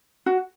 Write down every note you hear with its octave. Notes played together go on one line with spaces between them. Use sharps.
F#4